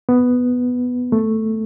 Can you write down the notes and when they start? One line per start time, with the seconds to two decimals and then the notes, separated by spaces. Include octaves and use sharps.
0.09 B3
1.12 A3